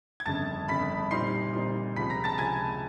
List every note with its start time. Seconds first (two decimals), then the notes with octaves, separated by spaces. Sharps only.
0.20 G#6
0.26 G1 F2 C#3 A5 A6
0.68 G1 F2 C#3 B5 B6
1.11 A#2 G3 C4 D#4 C6 C7
1.53 A#2 G3 C4 D#4
1.96 C#2 C3 F3 B5 B6
2.10 A#5 A#6
2.24 A5 A6
2.38 C#2 C3 F3 G#5 G#6